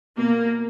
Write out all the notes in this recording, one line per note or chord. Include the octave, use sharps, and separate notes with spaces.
B2 A#3